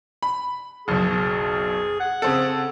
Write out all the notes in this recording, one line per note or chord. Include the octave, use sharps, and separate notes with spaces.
B5
F#1 B1 G#4
F#5
C#3 C4 A4